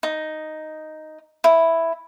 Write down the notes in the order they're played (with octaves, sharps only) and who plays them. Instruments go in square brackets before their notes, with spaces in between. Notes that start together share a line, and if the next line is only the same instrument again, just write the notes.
[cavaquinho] D#4
E4